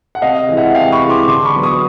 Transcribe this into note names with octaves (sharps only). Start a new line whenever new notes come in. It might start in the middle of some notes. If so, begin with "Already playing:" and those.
F#5
C3 D#5 F5
E3 G#3
E5 F#5
C3 F5 G5
B5 C#6
E3 G#3
C6 D6
D3 C6 D6
B5 C#6
F#3 B3
C#6 D#6